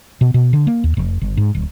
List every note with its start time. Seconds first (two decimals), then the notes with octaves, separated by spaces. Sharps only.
0.21 B2
0.34 B2
0.53 D3
0.67 A#3
0.84 D#2
0.97 F1
1.22 G1
1.37 G#2
1.55 D1